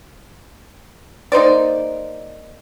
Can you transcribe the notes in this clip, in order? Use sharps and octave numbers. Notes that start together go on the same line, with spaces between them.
A#3 D#4 C5 D5